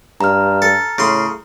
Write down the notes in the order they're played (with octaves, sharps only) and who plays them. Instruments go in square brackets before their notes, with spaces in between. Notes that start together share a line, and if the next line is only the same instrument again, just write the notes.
[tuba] G2 [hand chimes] A#5 F6
[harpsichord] A4
[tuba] A2 [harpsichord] C#3 C6